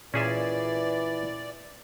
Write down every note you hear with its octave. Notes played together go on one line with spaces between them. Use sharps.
A#2 E3 C#4 G#4 D5 E5